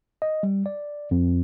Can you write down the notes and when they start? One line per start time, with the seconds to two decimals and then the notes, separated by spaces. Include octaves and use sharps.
0.22 D#5
0.43 G3
0.66 D5
1.11 F2